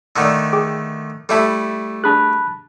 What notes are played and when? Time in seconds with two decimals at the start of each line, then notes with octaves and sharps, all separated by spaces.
0.16 D3 D#3 A3 D5 F#5 E6
0.53 G#4 G5 D6
1.29 G3 A3 E4 A4 E5 A5
2.04 D4 G#4 A5 B5 F#6